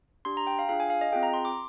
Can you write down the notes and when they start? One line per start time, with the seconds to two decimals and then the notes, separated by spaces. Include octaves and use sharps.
0.25 D4 G4 C6
0.37 A#5
0.47 G5
0.59 F5
0.69 D4 F4 G#4 F5
0.80 G#5
0.90 F5
1.01 D#5
1.12 C4 F4 G#4 G5
1.23 A#5
1.34 C6
1.45 D6